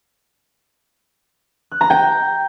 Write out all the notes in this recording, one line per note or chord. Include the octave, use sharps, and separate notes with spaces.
F#6
A#5
G5